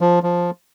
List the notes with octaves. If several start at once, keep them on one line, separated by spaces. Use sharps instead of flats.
F3
F3